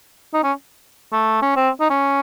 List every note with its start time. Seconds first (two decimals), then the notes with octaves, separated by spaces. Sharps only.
0.34 D#4
0.43 C#4
1.12 A3
1.42 C#4
1.56 C4
1.81 D#4
1.90 C#4